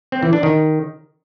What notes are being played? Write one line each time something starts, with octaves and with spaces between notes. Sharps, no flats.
C4
E3
D4
D#3